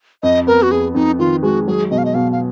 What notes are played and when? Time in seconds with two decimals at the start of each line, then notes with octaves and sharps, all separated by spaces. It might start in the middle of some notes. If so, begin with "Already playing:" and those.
0.23 F2 D#5
0.47 B3 A#4
0.63 F#4
0.71 F2 G#4
0.95 F2 D#4
1.19 D#3 F4
1.43 G#3 F#4
1.67 F#3 G#4
1.91 B2 D#5
1.98 F5
2.05 D#5
2.14 B2 F5
2.32 F5